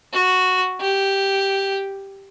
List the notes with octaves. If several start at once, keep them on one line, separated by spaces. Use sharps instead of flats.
F#4
G4